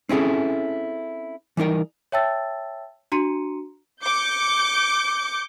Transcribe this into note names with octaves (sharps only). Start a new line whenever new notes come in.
C4 C#4 E4 G#4 A4
E3 G3 D#4 A#4
C#5 E5 G5 A5 E6 A6
D4 F#4 A#5 C6 C#7 D#7
D6 G6 C#7